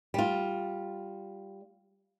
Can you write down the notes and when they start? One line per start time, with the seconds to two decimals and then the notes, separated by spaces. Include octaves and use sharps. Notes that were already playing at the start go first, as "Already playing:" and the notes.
0.14 G3 F4